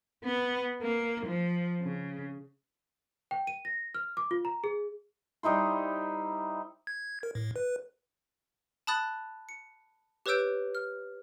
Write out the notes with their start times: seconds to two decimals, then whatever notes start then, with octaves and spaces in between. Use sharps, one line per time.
0.24 B3
0.82 A#3
1.26 F3
1.81 C#3
3.31 G5
3.47 D#7
3.65 A#6
3.94 F6
4.17 D6
4.31 F4
4.45 A#5
4.64 G#4
5.43 G3 D#4 E4 C5
6.87 G#6
7.23 A#4
7.35 A2
7.56 B4
8.87 A5 B5 D#6 F#6 A6
9.49 C#7
10.26 G4 B4 C#5 E6 G6 D7
10.75 F6